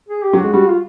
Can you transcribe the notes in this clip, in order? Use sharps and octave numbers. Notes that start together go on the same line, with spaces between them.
G#4
G4
F#3
F#4
G#3
G3 F#4
F4